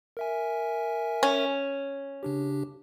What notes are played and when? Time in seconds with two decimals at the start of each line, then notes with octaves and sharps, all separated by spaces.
0.17 A#4 E5 G#5
1.23 C#4
2.23 C#3 D4 G4